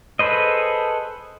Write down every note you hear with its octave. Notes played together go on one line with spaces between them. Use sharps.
G#4 A4 B4 C5 D#5